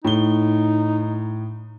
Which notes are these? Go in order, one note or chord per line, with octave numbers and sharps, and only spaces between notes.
A2 D#4 G7